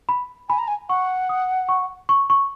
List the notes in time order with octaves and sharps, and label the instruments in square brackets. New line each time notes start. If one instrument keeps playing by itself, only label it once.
[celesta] B5
[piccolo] G#5 [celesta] B5
[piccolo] A#5
G#5
[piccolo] F#5 [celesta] C#6
[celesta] D#6
C#6
C#6
C#6